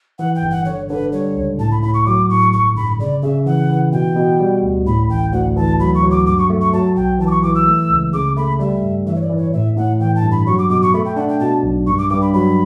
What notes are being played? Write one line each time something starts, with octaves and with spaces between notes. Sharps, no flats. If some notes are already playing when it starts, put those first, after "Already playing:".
E3 F#5
G5
G1
F#5
D3 C#5
D3 B4
G3 C#5
C#2
A2 A5
B5
A2 B5
C#6
F#3 D6
A2 C#6
G1 C#6
G1 B5
C#3 D5
C#3 E5
E3 F#5
E3
B2 G5
B2
G3
D2
A2 B5
A1 G5
D2 F#5
E3 A5
F#3 B5
C#6
F#3
D6
G2 D6
C#6
A3
C#6
F#3 A5
B1 G5
E3 A5
D6
C#6
E3 D6
E6
A3
C#2
C#3 D6
A3 B5
G3 E5
G2
E3 E5
C#5
D5
E3
C#5
A2 E5
A2 F#5
E3 G5
A5
G2
B5
F#3 C#6
D6
B2 D6
C#6
A3 B5
G5
D4 F#5
G5
B2 A5
B1
G2 C#6
D6
G2 D6
B5
F#3 B5